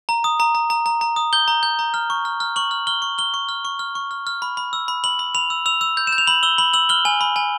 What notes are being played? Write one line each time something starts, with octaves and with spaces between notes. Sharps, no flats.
A#5
D#6
A#5
A#5
A#5
A#5
A#5
D#6
G6 G7
A#5
G6
A#5
F6
C#6
F6
F6
C#6 F#7
F6
F6 G7
C#6
F6 G7
C#6
F6
C#6
F6
C#6
F6
F6
B5
B5
E6
B5
B5 F#7
B5
B5 F7
E6
E6 F7
E6
G6
E7
G6
F7
B5 F#7
E6 G7
B5 F#7
E6 F#7
F6 G7
G#5
B5
G#5